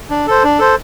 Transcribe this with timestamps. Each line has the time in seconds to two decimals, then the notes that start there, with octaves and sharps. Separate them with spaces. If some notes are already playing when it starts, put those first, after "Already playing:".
0.10 D4
0.27 A4 C5
0.44 D4
0.59 A4 C5